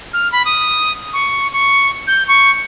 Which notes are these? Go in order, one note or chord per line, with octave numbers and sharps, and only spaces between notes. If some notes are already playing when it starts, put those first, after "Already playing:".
F6
B5
D#6
C#6
C#6
G6
C#6